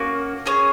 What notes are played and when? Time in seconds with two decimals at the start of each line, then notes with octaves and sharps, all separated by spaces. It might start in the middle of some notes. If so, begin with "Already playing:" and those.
Already playing: A#3 C#4 F#4
0.46 C#4 G#4 C#5